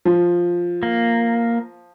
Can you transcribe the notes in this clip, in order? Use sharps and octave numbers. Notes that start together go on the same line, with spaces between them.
F3
A#3